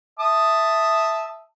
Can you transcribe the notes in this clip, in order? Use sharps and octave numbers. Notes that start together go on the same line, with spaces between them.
E5 A5 D#6